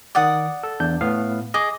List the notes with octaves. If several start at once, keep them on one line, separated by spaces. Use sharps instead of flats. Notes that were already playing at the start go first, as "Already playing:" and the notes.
D#3 D5 F#5 D6 D#6
A4
E2 D4 G6
A2 B3 F5
G#4 D#5 D6